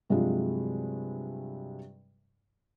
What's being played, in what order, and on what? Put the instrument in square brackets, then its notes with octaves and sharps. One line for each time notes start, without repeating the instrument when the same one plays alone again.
[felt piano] G2 C3 F3 F#3 G#3 F4